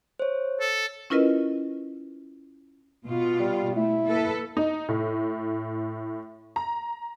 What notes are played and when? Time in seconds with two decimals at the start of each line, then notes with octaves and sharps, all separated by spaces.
0.20 C5 C#5
0.61 A4
1.10 C#4 E4 F4 A#4 B4 D#5
3.06 B2 F4
3.40 G3
3.76 A3 E4
4.07 A#3 A4 B4
4.57 D#4
4.89 A2
6.56 A#5